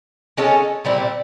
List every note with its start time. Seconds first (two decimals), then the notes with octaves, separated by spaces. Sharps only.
0.37 G#3 C#4 F4 A4
0.85 A#2 G3 C4 E4